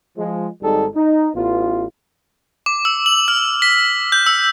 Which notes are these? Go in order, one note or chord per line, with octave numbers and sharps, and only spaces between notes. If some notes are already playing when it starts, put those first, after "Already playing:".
F3 G#3
G#1 G#2 G3 D#4 G#4 A4
D#4
A1 B3 F4
D6
E6
F#7
F6
B6
G6
E6